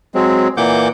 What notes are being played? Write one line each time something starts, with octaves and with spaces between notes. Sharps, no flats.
F#3 G#3 C4
A#2 E3 A#3 F#5 D6 G6